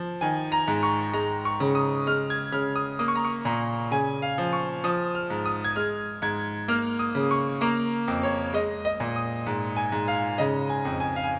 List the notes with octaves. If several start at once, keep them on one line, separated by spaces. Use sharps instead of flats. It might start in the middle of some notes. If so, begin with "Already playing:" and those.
Already playing: F3
D#3 G#5
A#5
G#2
C#6
G#3 A#5
C#6
C#3
D#6
G#3 F6
G#6
C#3 F6
D#6
A#3 D#6
C#6
A#5
C#6
A#2 A#5
C#3 G#5
F5
F3
C#6
F3 D#6
F6
G#2
D#6
G#6
G#3 F6
G#2 G#6
A#3 F6
D#6
C#3
C#6
A#3 A#5
F2
C#5
G#3 D#5
D#5
A#2
D#6
G#2
G#5
G#2
F5
C#3 D#5
G#5
F2
G#5
F5
G#5